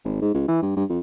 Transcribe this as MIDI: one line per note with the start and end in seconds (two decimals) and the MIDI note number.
0.04 0.21 32
0.21 0.32 44
0.34 0.46 37
0.48 0.62 52
0.62 0.73 43
0.76 0.84 43
0.89 0.99 41